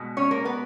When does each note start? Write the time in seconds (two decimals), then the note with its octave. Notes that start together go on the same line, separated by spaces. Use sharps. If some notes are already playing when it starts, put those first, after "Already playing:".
Already playing: B2 G#3
0.17 C#4 C#5
0.31 A#3 A#4
0.45 B3 B4